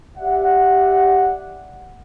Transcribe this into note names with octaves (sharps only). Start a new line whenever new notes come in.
G4 D5 E5 F#5